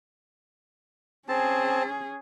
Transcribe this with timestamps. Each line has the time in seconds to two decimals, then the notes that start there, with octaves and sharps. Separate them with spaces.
1.28 C4 C#4 G#4 A5